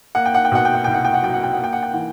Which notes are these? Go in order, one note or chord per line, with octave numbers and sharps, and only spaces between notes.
A#3 F#5
G5
F#5
G5
B2 F#5
G5
F#5
C2 G5
F#5
G5
F#5
F#3 G5
F#5
G5
A#3 F#5
G5
F#5
G5
E3 F#5